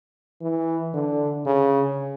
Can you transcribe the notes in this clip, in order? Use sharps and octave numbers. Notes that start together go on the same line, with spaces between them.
E3
D3
C#3